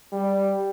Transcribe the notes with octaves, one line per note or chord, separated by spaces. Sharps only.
G3